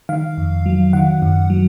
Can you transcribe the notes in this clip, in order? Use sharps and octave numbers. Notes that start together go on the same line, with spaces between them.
D#3 F5
F2
F#3
D#3 F#5
F#2
F#3